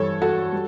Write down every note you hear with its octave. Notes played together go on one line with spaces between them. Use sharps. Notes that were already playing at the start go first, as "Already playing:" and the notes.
Already playing: G2 E3 G3 A4 C#5
F#4 A4
G3